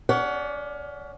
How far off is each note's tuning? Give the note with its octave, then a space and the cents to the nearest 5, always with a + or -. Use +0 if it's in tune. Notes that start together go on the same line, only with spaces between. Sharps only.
C#4 +30 D5 +0 F#5 +10